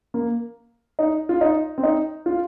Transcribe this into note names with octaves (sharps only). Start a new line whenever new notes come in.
A#3
D#4
F4
D#4
C4
D#4
F4